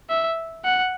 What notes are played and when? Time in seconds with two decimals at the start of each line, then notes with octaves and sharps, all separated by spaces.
0.10 E5
0.65 F#5